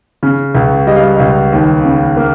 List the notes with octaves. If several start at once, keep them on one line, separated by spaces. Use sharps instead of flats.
C#3
C#2
G3 D#5
F5
D#5
C#2
D#2
C#3
A#3